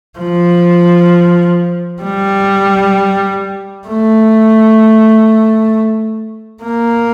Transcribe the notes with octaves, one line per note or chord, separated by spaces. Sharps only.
F3
G3
A3
A#3